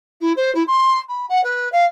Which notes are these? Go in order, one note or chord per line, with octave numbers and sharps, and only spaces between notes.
E4
C5
E4
C6
B5
F#5
B4
F5